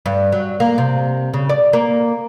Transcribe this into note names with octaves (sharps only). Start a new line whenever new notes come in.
G2
F#3
A#3
C3
C#3
D5
A#3